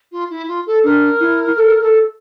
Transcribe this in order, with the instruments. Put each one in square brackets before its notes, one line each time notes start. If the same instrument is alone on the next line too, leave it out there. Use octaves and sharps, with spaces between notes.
[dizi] F4
E4
F4
A4
[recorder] D4 [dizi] A#4
[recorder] E4
A4
A4